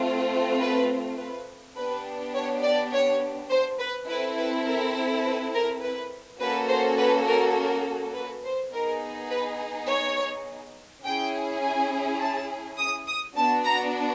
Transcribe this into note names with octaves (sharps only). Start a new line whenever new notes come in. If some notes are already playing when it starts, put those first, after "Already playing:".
Already playing: A3 C4 F4
B4
B4
B3 D4 G4 B4
C#5
D5
C#5
C5
B4
C4 E4 A4 B4
B4
A#4
B4
A#4
B4
A#3 C#4 F#4 A4 B4
C5
B4
A#4
A#4
B4
C5
B3 D#4 G#4 A#4
B4
C#5
C#4 E4 G#4 G5
G#5
A5
D#6
D#6
B3 D4 F#4 A5
A#5